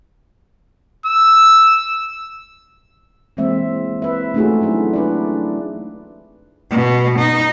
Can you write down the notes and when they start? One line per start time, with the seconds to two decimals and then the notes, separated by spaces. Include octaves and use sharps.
1.06 E6
3.37 E3 G#3 A#3 C4 E5
4.02 B4 E5
4.34 A3 C#4 D#4 F4 F#4 G#4
4.61 F#3 C#4 D4 E4
4.93 D4 B4 D5
6.71 B2
7.19 D#4